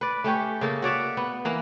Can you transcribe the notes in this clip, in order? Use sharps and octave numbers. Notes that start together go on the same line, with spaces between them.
B4 D5
A3 C#4 G4 C#5
C#3 A#3 A4
F#4 C#5 D5 E5
B3
E3 A#3